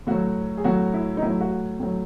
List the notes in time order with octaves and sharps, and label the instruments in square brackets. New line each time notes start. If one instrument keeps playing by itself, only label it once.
[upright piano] A2 F#3 F#4
G#4
A2 F#3 F#4
E4
D#4
A2 F#3 E4
F#4
A2 F#3